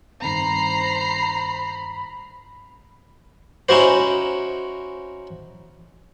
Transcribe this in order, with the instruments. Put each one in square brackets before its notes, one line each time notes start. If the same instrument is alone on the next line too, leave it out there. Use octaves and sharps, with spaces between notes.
[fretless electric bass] G2 D#3 C4 [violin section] C5 A#5 C7 [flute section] B5
[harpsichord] C#4 D#4 E4 F#4 C5